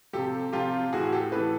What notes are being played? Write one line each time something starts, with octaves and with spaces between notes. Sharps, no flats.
C3 F3 G4 A4
C3 F3 F4 G4
A2 E3 F#4 G#4
G4 A4
A2 E3 A4 B4